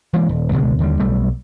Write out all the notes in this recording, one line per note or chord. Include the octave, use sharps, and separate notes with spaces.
E3 G#3 A#3
D#1
C#2 B2 D3 G#3
D#2 D3 G3
B1 G3 A3